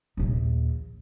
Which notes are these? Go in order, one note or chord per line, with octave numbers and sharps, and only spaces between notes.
A#1 D#2